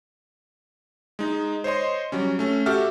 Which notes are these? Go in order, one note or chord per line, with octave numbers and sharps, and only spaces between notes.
G#3 D#4
C5 C#5 D#5 C6
F#3 G3 C#4
A3 C#4
F#4 G4 A4 E5 F6